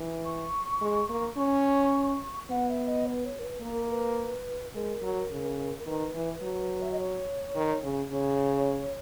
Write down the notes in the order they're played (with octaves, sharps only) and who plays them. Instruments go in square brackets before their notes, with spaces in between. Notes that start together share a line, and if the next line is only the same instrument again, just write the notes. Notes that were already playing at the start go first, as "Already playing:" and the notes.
Already playing: [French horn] E3
[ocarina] C#6
[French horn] G#3
A#3
[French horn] C#4 [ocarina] C#6
[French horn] B3 [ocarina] F#5
[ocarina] E5
D#5
B4
C#5
A#4
B4
[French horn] A#3 [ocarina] A#4
[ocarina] A#4
B4
[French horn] G#3 [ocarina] A#4
[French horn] F#3
C#3
[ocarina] A#4
[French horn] D#3 [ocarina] B4
[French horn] E3
F#3
[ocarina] E5
D#5
C#5
[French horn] D#3
C#3
[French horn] C#3 [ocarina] C#5